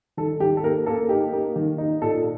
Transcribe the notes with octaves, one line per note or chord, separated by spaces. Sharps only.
D#3 A4
D#3 G4
A4
A#3 A#4
A#3 A4
D#4 G4
A#3
D#3
D#4
A#2 A4